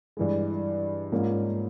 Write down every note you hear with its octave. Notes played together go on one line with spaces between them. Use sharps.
G2 E3 G#3
G#2 F3 A#3 C#4